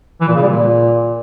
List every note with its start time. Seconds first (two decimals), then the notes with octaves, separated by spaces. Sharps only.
0.21 E3
0.28 A#2
0.35 C#3
0.42 G3
0.49 A#2